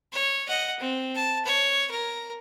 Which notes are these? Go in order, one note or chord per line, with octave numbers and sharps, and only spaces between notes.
C#5
D#5 F#5
C4
A5
C#5
A#4